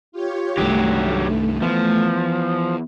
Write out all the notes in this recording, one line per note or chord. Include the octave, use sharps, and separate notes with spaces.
F4 G4 C#5
C2 G2 D#3 F#3 A3 G4
E3 F3 B3